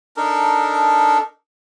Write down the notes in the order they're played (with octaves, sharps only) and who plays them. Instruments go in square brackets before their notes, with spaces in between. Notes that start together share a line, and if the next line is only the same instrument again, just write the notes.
[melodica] D4 D#4 A4 A#4